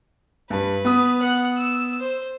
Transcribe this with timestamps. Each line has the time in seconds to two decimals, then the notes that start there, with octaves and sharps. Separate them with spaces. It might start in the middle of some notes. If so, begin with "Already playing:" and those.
0.50 G2 B4
0.85 B3 D#6
1.21 F#5 F#6
1.57 E6
2.00 C5